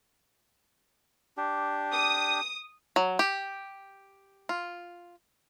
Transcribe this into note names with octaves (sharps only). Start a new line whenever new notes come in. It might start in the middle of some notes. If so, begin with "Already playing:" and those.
D4 G4
D#6
F#3
G4
F4